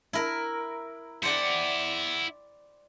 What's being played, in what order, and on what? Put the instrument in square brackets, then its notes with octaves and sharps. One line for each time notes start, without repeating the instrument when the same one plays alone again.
[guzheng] E4 A#4
[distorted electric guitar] E4 F#5 [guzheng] C5 D5 G5